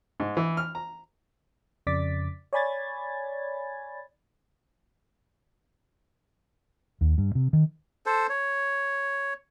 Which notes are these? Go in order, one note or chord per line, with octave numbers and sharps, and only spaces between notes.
G#2
E3
F6
A#5
F2 C#3 D5 D6 A6 B6
C#5 D5 G#5 B5 G#6 A6
D#2
G2
C3
D#3
A4 C5
C#5